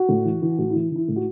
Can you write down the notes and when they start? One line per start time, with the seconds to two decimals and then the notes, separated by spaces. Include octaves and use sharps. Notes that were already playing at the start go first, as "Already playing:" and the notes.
Already playing: F#4
0.09 A2
0.25 E3
0.42 E3
0.58 A2 F#4
0.70 E4
0.75 E3
0.91 E3 E4
1.08 A2
1.16 F#4